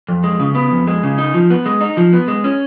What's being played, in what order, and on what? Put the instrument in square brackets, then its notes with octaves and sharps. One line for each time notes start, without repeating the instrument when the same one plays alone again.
[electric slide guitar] F2
G#3
C#3
B3
F2
G#3
C#3
D#4
F3
B3
G#3
D#4
F3
B3
G#3
C#4